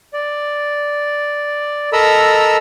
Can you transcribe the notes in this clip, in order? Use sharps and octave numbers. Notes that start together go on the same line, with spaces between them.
D5
A4 A#4 D#5 A#5 B5 E6